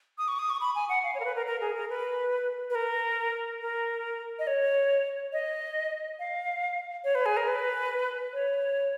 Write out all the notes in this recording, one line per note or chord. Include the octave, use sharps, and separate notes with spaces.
D#6
C#6
D#6
C#6
B5
G#5
F#5
F5
C#5
A#4
B4
A#4
A#4
G#4
A#4
B4
B4
A#4
A#4
D#5
C#5
D#5
F5
C#5
B4
G#4
A#4
B4
C#5